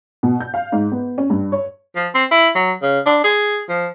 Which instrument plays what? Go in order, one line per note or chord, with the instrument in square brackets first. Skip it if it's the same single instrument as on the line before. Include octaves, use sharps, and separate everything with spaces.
[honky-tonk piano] B2
G6
F5
G#2
B3
C#4
G2
C#5
[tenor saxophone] F3
C4
E4
F#3
C#3
D4
G#4
F3